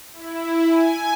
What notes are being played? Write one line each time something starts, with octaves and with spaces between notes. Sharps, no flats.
E4
G#5